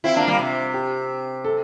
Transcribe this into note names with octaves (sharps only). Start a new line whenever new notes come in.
C4 E4 F4
A#3 D4
G3 A#3
C3
G4
A4